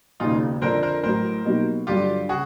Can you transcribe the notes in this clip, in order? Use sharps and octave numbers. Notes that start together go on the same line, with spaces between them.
E1 D#2 C#3 D#4 F4
F2 D3 F3 A#4 C5
A#4 C5
A1 A2 F#3 A#4 C5
B2 F#3 A#3 D#4 G4
G2 D3 F#3 F4 G4
C#3 F#4 G#4